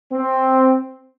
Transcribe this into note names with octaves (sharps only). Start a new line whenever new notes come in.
C4